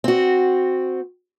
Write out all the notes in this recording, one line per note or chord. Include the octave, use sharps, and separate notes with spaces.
C4 F#4